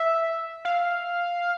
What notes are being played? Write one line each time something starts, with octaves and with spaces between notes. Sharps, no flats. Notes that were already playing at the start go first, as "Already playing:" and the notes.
Already playing: E5
F5